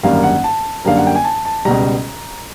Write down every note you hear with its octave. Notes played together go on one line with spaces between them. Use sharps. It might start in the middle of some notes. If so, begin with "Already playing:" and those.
G#1 F#2 D3 G3 A#3 F5
F#5
A5
F#2 D3 G3 A#3 F5
F#5
G5
G#5
A5
A5
C#2 B2 G3 A#5